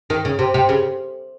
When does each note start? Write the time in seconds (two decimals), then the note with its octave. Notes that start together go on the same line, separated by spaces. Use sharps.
0.10 D#3
0.25 C#3
0.39 C3
0.54 C3
0.69 C#3